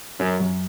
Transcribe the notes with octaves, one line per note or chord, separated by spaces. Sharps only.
F#2 C#4
F#2